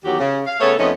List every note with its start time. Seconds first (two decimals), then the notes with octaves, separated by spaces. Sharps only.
0.05 E2 D#3 F#3 F#4 G4
0.19 C#3
0.46 F5
0.60 C#3 A3 B3 A4 C#5
0.78 F2 A3 B3 C#4 D#4 D#5